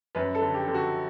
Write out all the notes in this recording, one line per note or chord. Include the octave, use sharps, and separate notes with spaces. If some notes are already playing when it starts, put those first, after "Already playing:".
F#2 B4
A4
D3
G4
D3
F#4